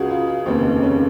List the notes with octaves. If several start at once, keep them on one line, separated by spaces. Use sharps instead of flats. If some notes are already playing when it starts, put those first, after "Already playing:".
Already playing: C#2 C#3 F4 F#4 G#4
F4
F1 D#2 C#3 C4
C#4